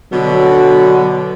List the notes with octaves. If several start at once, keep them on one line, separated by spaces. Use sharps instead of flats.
B2 D3 F#3